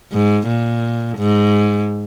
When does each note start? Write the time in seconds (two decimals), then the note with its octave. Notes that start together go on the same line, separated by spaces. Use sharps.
0.12 G#2
0.47 A#2
1.18 G#2